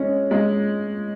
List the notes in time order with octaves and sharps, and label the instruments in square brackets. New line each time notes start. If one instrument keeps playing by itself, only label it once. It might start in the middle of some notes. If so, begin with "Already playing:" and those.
Already playing: [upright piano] G#3 C#4
G#3